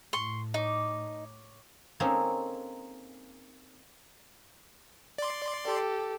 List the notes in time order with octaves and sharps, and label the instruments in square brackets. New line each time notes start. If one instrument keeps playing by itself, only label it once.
[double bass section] A2 [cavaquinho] C6 C#6
[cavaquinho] D#4 [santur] C#5 D6
[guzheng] A#3 C4 C#4 D#4 G#4 A4
[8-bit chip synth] D5 C6
[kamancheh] G4 A4